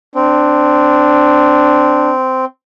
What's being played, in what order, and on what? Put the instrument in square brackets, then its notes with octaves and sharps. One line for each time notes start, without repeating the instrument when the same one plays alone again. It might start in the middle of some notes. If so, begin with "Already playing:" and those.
[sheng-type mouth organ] C4 [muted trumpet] D4